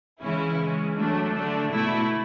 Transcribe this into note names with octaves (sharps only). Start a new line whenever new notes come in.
C#3 E3 G#3 C#4 E4
E3 G#3 C#4
F#3 A3 D4
D3 A3 D4
B2 A3 E4